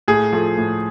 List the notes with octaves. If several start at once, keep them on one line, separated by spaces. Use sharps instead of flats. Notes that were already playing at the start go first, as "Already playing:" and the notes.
A2 G#4
F3 A3
A2